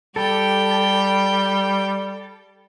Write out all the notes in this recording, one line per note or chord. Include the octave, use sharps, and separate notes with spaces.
G3 G4 A4 G5